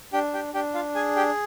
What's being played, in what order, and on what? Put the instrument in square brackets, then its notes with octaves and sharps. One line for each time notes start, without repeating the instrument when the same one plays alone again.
[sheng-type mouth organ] D4 G4 G5
G4 G5
D4 G4 G5
F4 F5
G#4 G#5
G4 G5